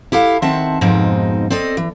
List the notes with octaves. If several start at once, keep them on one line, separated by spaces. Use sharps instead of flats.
E4 G4 A4 F5
D#3 C4 E5 F#5 A5
F2 G#2 B2 G#3 C4 D#4
C4 A4 D5 D#5
E3